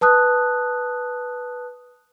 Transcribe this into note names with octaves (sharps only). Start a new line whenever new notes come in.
B4 A5 D#6 F#6